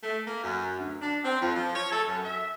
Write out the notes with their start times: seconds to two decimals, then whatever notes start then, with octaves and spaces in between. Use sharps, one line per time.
0.03 A3
0.27 A#3
0.44 F#2
0.78 D2
1.02 D4
1.23 C4
1.42 F2
1.55 F3
1.76 C#5
1.92 A4
2.07 F#2
2.24 E5